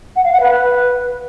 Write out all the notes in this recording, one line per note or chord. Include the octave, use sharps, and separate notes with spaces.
F#5
F5
F#5
B4